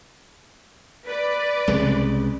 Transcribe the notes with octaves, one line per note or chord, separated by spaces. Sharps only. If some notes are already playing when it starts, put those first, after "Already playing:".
B4 D5
C2 C#3 G#3